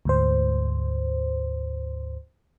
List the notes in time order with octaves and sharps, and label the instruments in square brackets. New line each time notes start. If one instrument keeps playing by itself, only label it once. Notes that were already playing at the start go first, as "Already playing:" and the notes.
[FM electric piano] D2 G#2 C5